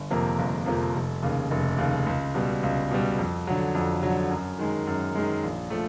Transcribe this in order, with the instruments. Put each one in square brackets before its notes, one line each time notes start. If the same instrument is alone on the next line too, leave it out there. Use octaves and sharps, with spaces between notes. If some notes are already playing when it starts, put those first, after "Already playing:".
Already playing: [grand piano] G1
F2 C3 F3 A#3
G1
F2 C3 F3 A#3
F1
D#2 C#3
F1
D#2 C#3
C#2
B2 G3
C#2
B2 G3
F2
D3 F#3
F2
D3 F#3
F#2
D#3 G#3
F#2
D#3 G#3
A#1
F3 A3